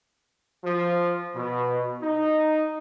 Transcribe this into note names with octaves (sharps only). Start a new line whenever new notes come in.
F3
B2
D#4